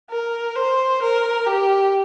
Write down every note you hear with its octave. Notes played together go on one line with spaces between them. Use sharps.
A#4
C5
A#4
G4